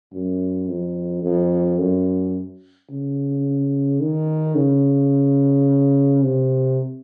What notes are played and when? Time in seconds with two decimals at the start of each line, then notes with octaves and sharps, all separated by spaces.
0.13 F#2
0.68 F2
1.24 F2
1.79 F#2
2.90 C#3
4.01 D#3
4.55 C#3
6.22 C3